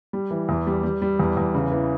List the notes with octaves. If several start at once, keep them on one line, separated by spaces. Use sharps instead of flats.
G3
E3
E2
G3
G3
G3
E2
E2
C#3
E3